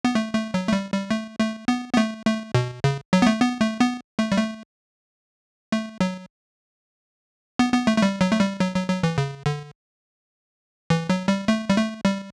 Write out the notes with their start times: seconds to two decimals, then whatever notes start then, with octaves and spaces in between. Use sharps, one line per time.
0.05 B3
0.15 A3
0.34 A3
0.54 F#3
0.68 A3
0.73 G3
0.92 G3
1.11 A3
1.40 A3
1.68 B3
1.94 B3
1.97 A3
2.27 A3
2.55 B2
2.84 C#3
3.13 F#3
3.22 B3
3.27 A3
3.41 B3
3.61 A3
3.80 B3
4.19 A3
4.32 G3
4.37 A3
5.72 A3
6.01 F#3
7.59 B3
7.73 B3
7.87 A3
7.97 A3
8.02 G3
8.21 F#3
8.32 A3
8.40 G3
8.60 F#3
8.75 F#3
8.88 F#3
9.03 E3
9.18 C#3
9.46 D3
10.90 E3
11.10 F#3
11.28 G3
11.48 A3
11.70 G3
11.77 A3
12.05 G3